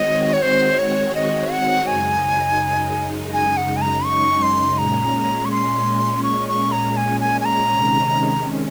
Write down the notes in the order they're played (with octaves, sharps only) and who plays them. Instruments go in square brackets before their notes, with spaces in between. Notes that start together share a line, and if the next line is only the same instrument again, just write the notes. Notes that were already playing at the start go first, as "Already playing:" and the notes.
Already playing: [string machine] D#3 G#3 C4 F#4 C#5 [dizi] D#5
[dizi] C#5
C5
C#5
D#5
F#5
[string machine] F#2 C#3 G#3 D#4 [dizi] G#5
[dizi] G#5
F#5
G#5
A#5
C#6
C6
[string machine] A#2 G#3 C#4 [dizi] A#5
[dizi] C#6
C6
C#6
C#6
A#5
G#5
G#5
G#5
A#5
[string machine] C3 D#3 G#3 C#4